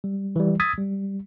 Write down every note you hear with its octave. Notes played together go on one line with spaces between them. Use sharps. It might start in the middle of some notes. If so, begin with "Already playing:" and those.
G3
E3 G3
D#6 E6 G#6 A6 B6
G3